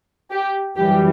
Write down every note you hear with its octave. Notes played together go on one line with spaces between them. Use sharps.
G4
F#2 E3 G3 G4